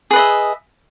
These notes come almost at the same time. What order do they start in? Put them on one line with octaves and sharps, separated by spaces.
G#4 B4 D#5 E5